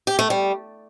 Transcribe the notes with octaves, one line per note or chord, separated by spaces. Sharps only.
G4
A3
G3